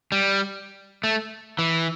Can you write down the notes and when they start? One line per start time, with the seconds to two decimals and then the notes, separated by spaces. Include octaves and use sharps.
0.12 G3
1.04 A3
1.59 E3